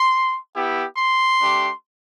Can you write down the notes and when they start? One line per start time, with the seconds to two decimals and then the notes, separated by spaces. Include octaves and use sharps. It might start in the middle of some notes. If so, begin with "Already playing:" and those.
Already playing: C6
0.55 B3 E4 G4
0.98 C6
1.40 A3 D4 G4